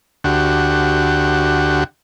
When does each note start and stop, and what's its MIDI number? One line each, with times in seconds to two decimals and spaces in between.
0.24 1.84 38
0.24 1.84 66
0.24 1.84 67